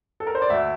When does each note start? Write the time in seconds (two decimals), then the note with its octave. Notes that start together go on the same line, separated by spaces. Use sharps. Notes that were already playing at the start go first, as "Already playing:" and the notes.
0.20 A4
0.27 A#4
0.35 C5
0.42 D5
0.50 D2 E5